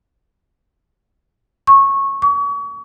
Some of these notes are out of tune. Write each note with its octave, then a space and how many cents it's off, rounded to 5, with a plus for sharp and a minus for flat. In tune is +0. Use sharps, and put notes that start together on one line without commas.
C#6 -15
C#6 +35